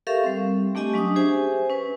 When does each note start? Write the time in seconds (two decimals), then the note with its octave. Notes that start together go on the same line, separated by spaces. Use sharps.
0.07 G4 A4 A#4 E5 F5 C#6
0.24 G3 C4
0.75 A3 D4 G4 D#5 G#5 C#6
0.94 F#3 C#4 D4 D#6
1.16 G4 G#4 C5 E5 G#5
1.70 C#4 B4